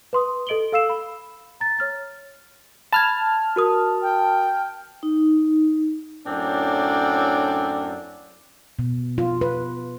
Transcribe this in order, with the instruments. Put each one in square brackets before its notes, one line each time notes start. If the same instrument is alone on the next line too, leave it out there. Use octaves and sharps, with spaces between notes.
[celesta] B4 C6 D#6
A4 D#5 D7 F#7 G7
A4 F5 E6 C7 E7
B5
A#5 A6
C#5 F6 A6
[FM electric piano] A5 F6 [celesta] B5 G#6
[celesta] F#4 A#4 D#6
[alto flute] G5
[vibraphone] D#4
[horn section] F#2 A2 C4 D4 D5
[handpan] B2
F4
B4